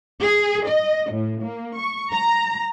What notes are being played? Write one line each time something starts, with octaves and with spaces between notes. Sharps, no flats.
G#4
D#5
A2
A#3
C#6
A#5